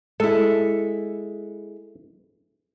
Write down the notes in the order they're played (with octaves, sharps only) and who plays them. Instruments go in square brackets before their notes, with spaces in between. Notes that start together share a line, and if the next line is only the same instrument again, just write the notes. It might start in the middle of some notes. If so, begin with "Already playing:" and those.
[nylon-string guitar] G#3 E4 [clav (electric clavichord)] A4